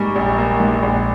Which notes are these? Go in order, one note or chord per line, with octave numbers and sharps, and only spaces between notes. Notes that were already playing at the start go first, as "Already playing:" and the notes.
Already playing: G#2 G3 A#3 G#5 A#5 C#6
A#1
A#3
G#2
A#1